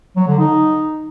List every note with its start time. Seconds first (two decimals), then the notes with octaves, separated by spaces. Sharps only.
0.17 F#3
0.28 D3
0.39 D#4